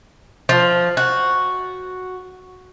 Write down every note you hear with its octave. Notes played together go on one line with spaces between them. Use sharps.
F3
F#4